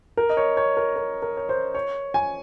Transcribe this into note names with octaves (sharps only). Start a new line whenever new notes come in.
A#4
D#5
C#5
C#5
A#4
A#4
A#4
C#5
C5
C#5
G#5